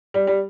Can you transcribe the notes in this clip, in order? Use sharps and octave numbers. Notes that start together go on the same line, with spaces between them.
G3
G3